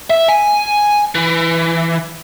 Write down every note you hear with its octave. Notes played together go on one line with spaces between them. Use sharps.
E5
G#5
E3